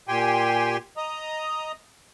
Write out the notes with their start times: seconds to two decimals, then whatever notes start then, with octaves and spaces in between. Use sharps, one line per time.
0.08 A#2 G4 G5 G#5 C6
0.97 D#5 A#5 D#6